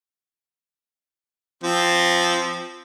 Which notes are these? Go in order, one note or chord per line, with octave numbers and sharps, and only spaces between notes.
F3 C4